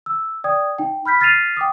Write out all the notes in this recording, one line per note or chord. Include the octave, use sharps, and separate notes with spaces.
E6
D5 G5 D#6 G#6
D#4 G5
B5 F6 G6 B6
F6 A6 B6 C7 D#7 F7
G5 D6 D#6